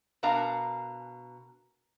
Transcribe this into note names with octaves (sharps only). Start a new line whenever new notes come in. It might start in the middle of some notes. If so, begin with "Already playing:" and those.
B2 D4 A#4 F5 A#5